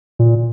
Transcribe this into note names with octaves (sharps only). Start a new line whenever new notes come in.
A#2